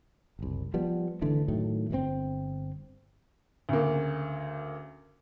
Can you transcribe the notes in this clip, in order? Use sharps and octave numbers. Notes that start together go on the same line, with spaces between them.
F#1 C2
F3 G3 B3
G#1 D3 E3 A3
A2 D#3 F#3 A3
G1 A#2 C4
D2 C#3 A#3